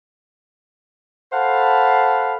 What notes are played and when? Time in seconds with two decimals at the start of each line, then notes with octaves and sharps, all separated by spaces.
1.33 A4 C5 F5 F#5 A5 B5